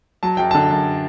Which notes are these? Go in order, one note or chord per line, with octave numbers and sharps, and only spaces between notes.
F#3 A5
F#2 G5
D3 A5
F#2